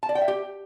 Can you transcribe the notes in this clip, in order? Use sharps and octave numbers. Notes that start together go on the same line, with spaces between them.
A5
D5
G5
E5
G4